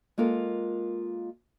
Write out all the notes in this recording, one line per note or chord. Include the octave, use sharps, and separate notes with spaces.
G#3 A#3 F4 A4 A#4